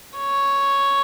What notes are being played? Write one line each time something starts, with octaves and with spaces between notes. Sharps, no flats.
C#5